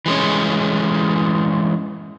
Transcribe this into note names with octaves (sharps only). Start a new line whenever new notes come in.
E3 G#3 C#4